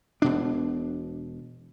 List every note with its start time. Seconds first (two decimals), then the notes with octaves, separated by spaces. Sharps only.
0.22 E1 B2 D4